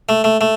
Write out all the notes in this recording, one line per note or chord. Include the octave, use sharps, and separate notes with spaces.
A3
A3
A3